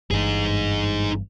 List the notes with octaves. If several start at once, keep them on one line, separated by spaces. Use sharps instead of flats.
G1 G2 E3 D#4 G#4